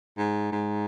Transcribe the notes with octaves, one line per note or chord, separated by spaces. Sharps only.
G#2
G#2